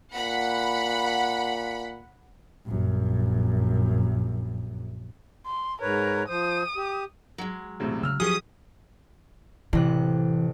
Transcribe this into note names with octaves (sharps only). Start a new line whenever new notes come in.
A#2 F#5 B5
A#1 F#2
C6
G#2 A#4 B4 C#5
F3 C5 D#6
G4
F#3 G#3
E1 A2 C3
C#3 E6 F6
F3 F#3 C#4 G4 G#4 C#5 D#6
A1 C3 E3 F#6